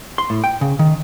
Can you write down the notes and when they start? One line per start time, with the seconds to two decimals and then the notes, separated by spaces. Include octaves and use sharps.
0.18 C6
0.30 A2
0.44 G5
0.61 C#3
0.79 D#3